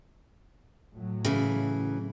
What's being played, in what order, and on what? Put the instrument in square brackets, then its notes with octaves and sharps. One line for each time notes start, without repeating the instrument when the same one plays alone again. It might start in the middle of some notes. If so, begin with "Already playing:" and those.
[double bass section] A2 F#3
[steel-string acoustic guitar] C#3 E3